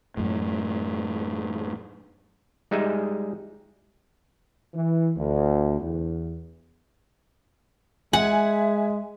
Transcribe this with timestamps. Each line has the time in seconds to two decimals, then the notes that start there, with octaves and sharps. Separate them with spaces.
0.17 F#2 A2
2.71 G3 G#3 D#4 G#4 E5
4.74 E3
5.17 D2
5.80 E2
8.13 G#3 E5 F#5 G#5